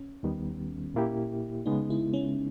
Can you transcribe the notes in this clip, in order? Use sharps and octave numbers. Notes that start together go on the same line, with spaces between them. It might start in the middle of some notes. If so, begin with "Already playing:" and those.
Already playing: C#4
D#2 D#3 G3 B3
A#2 A#3 E4 G4
C#3 G#3 B3 D#4
E4
C#4